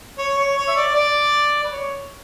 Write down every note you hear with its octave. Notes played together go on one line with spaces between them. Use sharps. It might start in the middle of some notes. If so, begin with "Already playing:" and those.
C#5
C#5
C#5
E5
D5
D5
B4
C#5